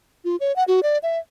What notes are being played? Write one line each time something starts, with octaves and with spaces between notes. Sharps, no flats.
F4
C#5
F#5
F#4
D5
E5